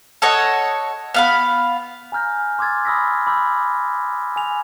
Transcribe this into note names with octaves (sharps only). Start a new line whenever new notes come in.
A4 C#5 D#5 F#5
B3 F5 B5
G#5 A#5 F6 G6 A#6
C6 D6 E6 G#6 A6
B5 D#6 E6 A#6 B6
B5 D6 E6 G6
G#5 F7